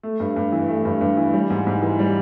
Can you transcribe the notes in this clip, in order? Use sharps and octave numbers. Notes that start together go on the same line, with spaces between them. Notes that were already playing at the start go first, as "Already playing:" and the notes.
A3
G2
G2
E3
A3
G2
G2
E3
G3
G#2
G#2
E3
G3